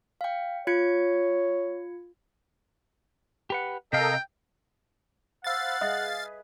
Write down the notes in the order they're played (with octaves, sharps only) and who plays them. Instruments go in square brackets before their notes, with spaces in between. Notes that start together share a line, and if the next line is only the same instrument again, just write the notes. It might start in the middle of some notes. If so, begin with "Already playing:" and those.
[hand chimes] F5 G5
[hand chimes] F4 G#6 C#7 [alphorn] C#5
[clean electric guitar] G4 B4 F#5
[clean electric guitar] C3 F5 [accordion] A4 A#4 D#5 [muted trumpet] G5
[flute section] C5 B5 E6 [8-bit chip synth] F5 A6 [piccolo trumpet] F#5
[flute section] G#4 B4 [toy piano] D#5 E5 D#6